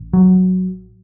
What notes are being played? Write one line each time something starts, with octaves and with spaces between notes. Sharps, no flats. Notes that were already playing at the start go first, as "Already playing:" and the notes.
Already playing: A1
F#3